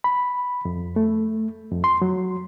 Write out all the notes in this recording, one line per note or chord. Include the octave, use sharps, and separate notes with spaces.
B5
F2
A3
F2
C6
F#3